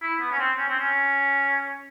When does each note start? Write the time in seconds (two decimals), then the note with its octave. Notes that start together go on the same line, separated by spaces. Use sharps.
0.02 E4
0.20 B3
0.32 C#4
0.39 C4
0.58 C#4
0.69 C4
0.79 C#4